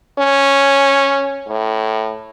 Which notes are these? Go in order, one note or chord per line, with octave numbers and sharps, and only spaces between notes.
C#4
A2